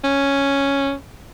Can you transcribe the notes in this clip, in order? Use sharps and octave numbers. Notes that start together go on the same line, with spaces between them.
C#4